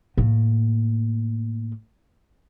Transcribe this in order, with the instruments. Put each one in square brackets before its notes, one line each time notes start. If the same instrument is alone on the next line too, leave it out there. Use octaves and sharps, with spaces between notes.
[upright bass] A2 A#3